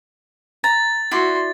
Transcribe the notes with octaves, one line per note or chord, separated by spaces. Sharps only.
A#5 A6
E4 F#4 D5 F#5 C6